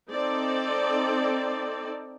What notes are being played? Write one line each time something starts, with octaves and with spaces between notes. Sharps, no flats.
C4 D#4 A4 D5